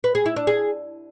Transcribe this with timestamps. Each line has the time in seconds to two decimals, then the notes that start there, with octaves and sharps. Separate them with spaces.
0.04 B4
0.15 G#4
0.26 E4
0.36 D4
0.47 G#4